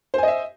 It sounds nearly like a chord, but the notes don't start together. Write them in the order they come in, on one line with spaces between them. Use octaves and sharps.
C5 G#5 D#5 E5